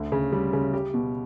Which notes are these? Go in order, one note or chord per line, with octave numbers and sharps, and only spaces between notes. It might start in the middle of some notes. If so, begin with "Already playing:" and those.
Already playing: D2 D3
C#3
G3
C#3
G4
B2